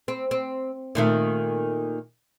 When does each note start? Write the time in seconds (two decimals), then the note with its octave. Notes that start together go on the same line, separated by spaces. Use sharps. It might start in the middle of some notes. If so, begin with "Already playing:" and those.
0.08 C4
0.31 C4
0.95 A#2 D#3 A3